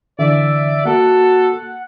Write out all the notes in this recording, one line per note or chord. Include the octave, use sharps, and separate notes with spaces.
D3 E3 D5 E5
A#3 F#4 A4 F#5